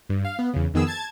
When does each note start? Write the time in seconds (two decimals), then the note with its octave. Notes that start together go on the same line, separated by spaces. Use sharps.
0.09 G2
0.25 F5
0.39 B3
0.54 E2 C#3
0.74 F2 D#3 B3 G#4 E6
0.87 A5 G#6 A6